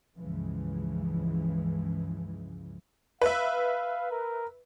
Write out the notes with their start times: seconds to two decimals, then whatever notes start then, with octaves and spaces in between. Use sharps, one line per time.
0.15 C#2 G2 C#3 E3 F3 G#3
3.22 B4 E5 F5
4.11 A#4